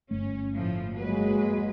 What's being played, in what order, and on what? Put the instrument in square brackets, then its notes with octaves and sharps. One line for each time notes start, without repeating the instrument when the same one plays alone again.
[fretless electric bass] G1 A3 [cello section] C#4
[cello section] A2 F3
[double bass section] F#3 G#3 [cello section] A#3 B4